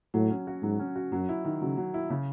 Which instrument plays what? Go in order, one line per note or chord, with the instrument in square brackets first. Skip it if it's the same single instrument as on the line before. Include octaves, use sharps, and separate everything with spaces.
[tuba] A2 [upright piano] F#3
[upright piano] C#4
F#4
[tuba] G#2 [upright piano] F#3
[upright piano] C#4
F#4
[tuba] F#2 [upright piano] F#3
[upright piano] E4
D#3
[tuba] C#3 [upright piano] F#3
[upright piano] F#3
E4
C#3